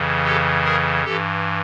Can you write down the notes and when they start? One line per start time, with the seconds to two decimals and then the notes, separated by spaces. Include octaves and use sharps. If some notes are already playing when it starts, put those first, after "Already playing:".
Already playing: F2 C#3 E3
0.24 G4 A4
0.64 G#4 A#4
1.04 G2 E3 G4 A4